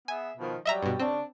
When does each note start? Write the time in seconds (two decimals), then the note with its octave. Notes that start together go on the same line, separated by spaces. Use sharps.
0.08 B3 G#4 E5 G#5
0.38 B2 D#3 F3
0.65 F#3 G3 D#5 E5 A#5
0.82 G2 B2
1.00 C#3 C4 D4